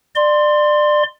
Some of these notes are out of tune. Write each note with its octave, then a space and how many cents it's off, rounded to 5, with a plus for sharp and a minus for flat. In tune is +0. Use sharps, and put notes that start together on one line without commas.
D5 +25 C6 +0